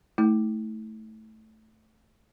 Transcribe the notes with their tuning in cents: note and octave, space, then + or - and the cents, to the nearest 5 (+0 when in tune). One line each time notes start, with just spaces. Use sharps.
A3 +0 E4 -35